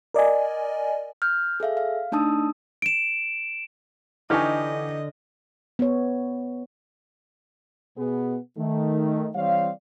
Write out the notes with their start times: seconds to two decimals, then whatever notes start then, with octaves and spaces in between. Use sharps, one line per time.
0.14 A#4 D5 D#5 G#5
1.22 F6 G6
1.60 G#4 A4 E5 F5
1.77 F5
2.12 A3 D4 D#4 A5 D#6 E6
2.82 D7 E7
4.30 D3 E3 D#4 G4 D#5 G#5 C#6 F6
5.79 B3 C#5
7.97 B2 B3 G#4
8.58 D#3 A3
9.36 E3 G3 C4 C#5 D5 F5